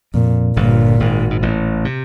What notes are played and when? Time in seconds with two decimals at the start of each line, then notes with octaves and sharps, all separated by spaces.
0.14 F2 A#2
0.57 G1 G2 A#2
1.00 G#1 G#2
1.30 G#2
1.42 A1 A2
1.85 C3